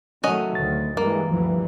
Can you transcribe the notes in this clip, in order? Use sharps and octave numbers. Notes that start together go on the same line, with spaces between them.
D#3 F#3 A3 C#4 F#4 D#5
D2 D#3 A6
G2 E3 G#3 A#3
D2 G2 E3 F3